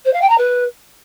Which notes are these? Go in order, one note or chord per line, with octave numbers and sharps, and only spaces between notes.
C5
F5
G5
A#5
B4